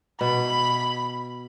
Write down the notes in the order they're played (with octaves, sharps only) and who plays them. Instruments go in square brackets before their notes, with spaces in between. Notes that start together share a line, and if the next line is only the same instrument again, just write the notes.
[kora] B2 [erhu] B5